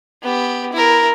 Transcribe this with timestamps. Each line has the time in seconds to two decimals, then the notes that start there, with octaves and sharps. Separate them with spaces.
0.23 B3 G4
0.73 E4 A#4